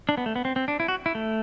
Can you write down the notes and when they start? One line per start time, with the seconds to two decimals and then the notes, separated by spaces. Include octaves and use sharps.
0.09 D4
0.18 B3
0.26 A3
0.36 B3
0.45 C4
0.56 C4
0.68 D4
0.80 E4
0.88 F#4
1.06 E4
1.15 A3